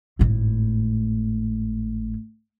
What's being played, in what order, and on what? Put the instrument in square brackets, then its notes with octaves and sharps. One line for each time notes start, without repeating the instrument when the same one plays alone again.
[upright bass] G#1 A2